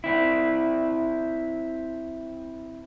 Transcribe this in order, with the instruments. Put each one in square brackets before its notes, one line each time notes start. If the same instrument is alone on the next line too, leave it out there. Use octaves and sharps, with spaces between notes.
[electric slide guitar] C4 E4